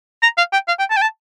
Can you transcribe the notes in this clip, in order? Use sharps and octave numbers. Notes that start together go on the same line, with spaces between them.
A#5
F5
G5
F5
G5
A5
G5
A5